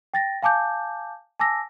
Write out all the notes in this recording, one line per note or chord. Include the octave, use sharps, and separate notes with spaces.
G5 A6 A#6
F5 G#5 A5 D6 G6
G#5 A5 D6 E6 A#6